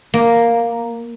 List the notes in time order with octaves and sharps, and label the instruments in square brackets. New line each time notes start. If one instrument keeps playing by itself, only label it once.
[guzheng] A#3